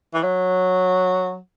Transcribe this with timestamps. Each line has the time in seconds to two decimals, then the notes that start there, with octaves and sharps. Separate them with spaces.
0.14 E3
0.23 F#3